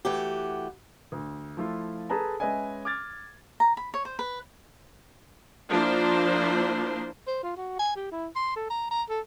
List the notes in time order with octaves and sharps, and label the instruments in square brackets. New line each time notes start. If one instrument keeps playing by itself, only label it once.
[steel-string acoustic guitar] E3 A3 F#4 G4
[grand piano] D2
F3 A3 E4 F4
G#4 A4 B4 A5 A#5
G#3 C#4 B4 D#5 E5 G#5
D6 F6 G#6 A6
[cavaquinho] A#5
B5
C#5
C5
B4
[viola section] F3 A#3 D4 E4 C5 C6
[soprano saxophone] C5
F4
F#4
G#5
G4
E4
C6
A4
A#5
A#5
A4